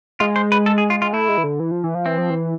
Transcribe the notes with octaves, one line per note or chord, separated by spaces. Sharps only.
G#3 F4
C5
B4
A4
G#4
F4
F4
A3 E4
G#3
E3
D3
E3
F3
E3
F3
E3 C4
F3
E3